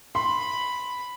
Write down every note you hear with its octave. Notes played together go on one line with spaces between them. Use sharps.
B5 C6